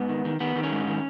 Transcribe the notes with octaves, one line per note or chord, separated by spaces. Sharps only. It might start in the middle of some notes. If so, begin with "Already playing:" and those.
Already playing: G#2 B3
D#3
D#3
D#3 B3
D#3
C#4
G#2
D#3